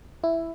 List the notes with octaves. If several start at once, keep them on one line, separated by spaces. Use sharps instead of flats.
E4